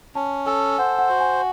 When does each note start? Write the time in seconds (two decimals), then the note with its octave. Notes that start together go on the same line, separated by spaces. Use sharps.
0.15 C#4 A5
0.46 A4 G#5
0.78 C5 F#5
0.99 F#5
1.09 F#4
1.21 G#5